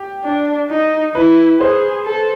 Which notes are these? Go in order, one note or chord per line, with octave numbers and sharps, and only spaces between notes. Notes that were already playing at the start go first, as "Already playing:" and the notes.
Already playing: G4
D4
D#4
E4 B4
G#4 C5
A4